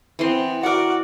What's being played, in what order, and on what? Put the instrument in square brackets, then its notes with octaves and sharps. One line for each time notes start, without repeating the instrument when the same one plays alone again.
[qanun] E3 C6 [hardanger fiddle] B3 C4
[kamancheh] F#4 [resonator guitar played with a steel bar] A#4 F#5 [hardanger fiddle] D5